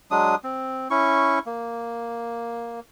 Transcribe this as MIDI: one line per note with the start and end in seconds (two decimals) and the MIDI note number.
0.11 0.35 54
0.11 0.35 56
0.11 0.35 62
0.11 0.35 87
0.44 0.88 60
0.90 1.39 61
0.90 1.39 64
0.90 1.39 85
1.46 2.80 58